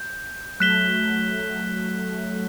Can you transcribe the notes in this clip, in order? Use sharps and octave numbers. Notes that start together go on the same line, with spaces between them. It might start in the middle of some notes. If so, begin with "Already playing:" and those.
Already playing: G6
F#3 A3 F#6 B6 E7 G7